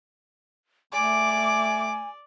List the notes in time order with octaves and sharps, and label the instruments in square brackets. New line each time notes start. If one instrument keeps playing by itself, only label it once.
[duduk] A3 [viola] D5 [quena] G#5 [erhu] D6